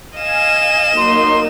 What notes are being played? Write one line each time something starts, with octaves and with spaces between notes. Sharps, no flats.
D#5 F5 G#5 E7
F#3 A#3 D#4 C6